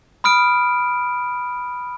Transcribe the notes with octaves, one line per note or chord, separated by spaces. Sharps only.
B5 D#6 F6 D7